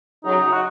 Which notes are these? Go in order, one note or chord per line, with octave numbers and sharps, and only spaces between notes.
F#2 C#3 F#3 D#4
F#4